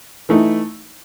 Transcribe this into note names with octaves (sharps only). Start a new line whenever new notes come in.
E3 A3 D#4